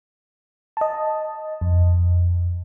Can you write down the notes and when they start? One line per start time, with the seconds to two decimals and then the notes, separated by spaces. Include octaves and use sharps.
0.77 D#5 A5
1.61 F2